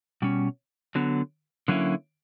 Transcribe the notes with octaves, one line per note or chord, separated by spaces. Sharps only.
B2 G3 C#4
D3 F#3 B3
D3 F#3 A#3 C#4 E4